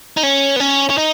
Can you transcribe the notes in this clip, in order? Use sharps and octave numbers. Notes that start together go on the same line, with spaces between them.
D#4
C#4
B3
C#4
C#4
D#4